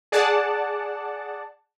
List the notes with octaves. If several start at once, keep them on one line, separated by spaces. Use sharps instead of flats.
G#4 D5 F#5 A5